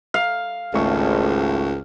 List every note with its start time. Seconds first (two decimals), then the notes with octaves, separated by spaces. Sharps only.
0.14 F5
0.74 G#1 C#2 A3 E5 C#6